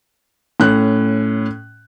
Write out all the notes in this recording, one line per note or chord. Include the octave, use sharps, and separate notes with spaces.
A2 C#4 F#6